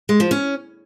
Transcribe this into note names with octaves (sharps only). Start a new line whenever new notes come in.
G#3
F3
C#4